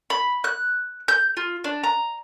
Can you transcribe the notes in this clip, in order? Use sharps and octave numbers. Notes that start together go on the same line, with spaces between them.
B5
F#6
G6
F4
D4
A#5